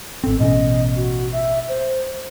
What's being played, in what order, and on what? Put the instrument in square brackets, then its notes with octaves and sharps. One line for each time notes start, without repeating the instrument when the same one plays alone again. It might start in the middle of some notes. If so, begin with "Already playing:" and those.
[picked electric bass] G#1 C4 [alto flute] A4
[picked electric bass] A1 B2 C#4 [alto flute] D#5
[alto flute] F#4
E5
C5